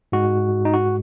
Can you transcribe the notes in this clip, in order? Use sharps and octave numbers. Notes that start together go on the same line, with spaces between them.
G#2 G#3 F#4
D#4
F#4